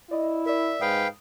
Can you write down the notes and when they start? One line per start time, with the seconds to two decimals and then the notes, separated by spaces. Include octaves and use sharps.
0.11 E4 D5 D#5
0.46 A#4 D5 E5
0.81 G#2 B4 F5 G5 D#6